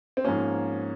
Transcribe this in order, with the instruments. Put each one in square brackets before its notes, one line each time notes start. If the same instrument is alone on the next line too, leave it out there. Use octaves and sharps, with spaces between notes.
[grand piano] C4
G#2 F3 A#3 C#4